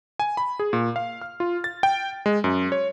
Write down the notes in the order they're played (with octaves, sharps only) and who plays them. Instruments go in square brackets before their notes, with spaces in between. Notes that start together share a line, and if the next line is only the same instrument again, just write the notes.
[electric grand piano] G#5
B5
G#4
A#2
F5
F6
F4
A6
G5
G#3
F#2
C#5